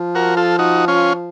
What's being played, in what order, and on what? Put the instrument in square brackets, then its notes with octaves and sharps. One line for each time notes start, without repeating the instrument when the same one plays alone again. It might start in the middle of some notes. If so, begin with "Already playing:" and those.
Already playing: [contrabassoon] F3
[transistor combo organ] F#4 A#4
F4 A4
D#4 F#4
C#4 F4